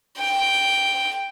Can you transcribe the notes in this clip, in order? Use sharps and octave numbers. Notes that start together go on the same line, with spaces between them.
G5